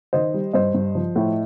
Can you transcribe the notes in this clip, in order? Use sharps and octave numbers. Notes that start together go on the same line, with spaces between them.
D#3 C5 D#5
G3
G2 C5 D#5
G2
F3
A2